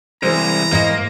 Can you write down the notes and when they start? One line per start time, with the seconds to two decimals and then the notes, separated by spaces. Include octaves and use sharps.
0.23 C2 E3 G#3 C5 A#5
0.72 G#2 A#3 D#5